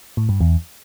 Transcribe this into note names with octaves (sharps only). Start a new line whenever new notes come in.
A2
G2
E2